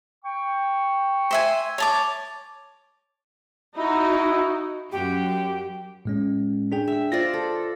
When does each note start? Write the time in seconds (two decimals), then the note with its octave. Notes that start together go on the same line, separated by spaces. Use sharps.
0.24 G5 C#6
1.31 C5 E5 G#5
1.78 C#5 A5 D6
3.78 D#4 E4 F#4
4.92 F#2 F#4 G4
6.05 A2 G#3 C#4
6.72 D4 G#4 G5
6.88 E5
7.12 F4 C5 D5 A#6
7.34 A4